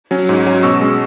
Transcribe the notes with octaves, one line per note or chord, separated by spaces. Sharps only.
F#3 C#4
G#2
F#3 C#4
B2 C#6 E6
G#3 C#4